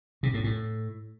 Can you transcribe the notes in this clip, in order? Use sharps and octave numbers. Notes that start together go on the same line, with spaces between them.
C3
A2
A2